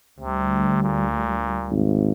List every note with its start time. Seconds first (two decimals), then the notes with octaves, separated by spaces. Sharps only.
0.20 D2 C3 G3
0.83 A#2
1.71 G#1